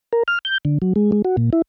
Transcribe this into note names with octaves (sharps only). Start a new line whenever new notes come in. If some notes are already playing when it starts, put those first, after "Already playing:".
A#4
F6
G6
D3
F#3
G#3
G#3
F#4
A#2
E4